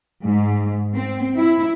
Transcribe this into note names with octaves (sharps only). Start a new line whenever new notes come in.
G#2
C4
E4